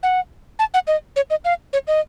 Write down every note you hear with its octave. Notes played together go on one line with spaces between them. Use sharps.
F#5
A5
F#5
D#5
C#5
D#5
F5
C#5
D#5